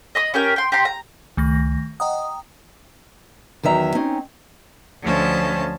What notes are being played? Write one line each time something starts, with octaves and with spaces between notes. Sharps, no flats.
D#5 B5 D#6
C#4 G4 A#4 G5
G5 C6
G4 G5 A#5 C6
A#5
C#2 D#3 A3 A#6
D#5 F#5 G5 A#5 D#6
E2 D#3 F#3 E5 A#5
C4 C#4 D#4
D2 F3 C#4 C5 A5